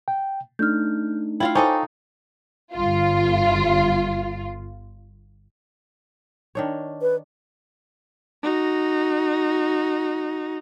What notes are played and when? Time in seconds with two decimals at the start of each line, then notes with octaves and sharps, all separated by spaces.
0.08 G5
0.59 A3 D4 D#4 F6 G6
1.40 E4 F4 F5 G5
1.55 D#4 A4 C5 D#5 G5 G#5 C#6 D6
2.74 G1 F4
6.55 D#3 D4 C#5
7.02 B4
8.42 D#4 F#4